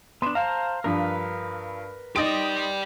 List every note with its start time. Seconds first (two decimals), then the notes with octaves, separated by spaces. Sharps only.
0.22 B3 D4 C6 E7
0.35 C5 F5 A5 A#5
0.84 G2 F3 A#4 B4
2.16 D#4 G4 D5 C6 D#6 A#6 D7